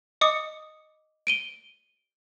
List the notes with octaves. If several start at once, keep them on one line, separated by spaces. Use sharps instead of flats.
D#5 D6 D#6 C#7
D7 D#7 G7